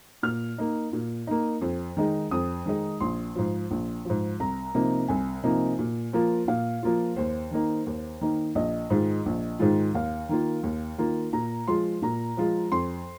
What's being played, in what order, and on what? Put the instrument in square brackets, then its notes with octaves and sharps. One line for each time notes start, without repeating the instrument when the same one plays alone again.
[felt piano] A#2 F6
A#3 D#4
A#2
A#3 D#4
F2
D#3 G#3 D#4
F2 D#6
D#3 G#3 D#4
A#1 C6
G#2 F3
A#1
G#2 F3
C2 A#5
C3 F3 A#3 D#4
C2 G#5
C3 F3 A#3 D#4
A#2
F3 A#3 F4
A#2 F5
F3 A#3 F4
D#2 C5
D#3 A#3 D#4
D#2
D#3 A#3 D#4
A#1 D#5
G#2 D#3 G#3 F4
A#1
G#2 D#3 G#3 F4
D#2 F5
D#3 A#3 F4
D#2
D#3 A#3 F4
A#2 A#5
F3 G#3 F4 C6
A#2 A#5
F3 G#3 F4
F2 C6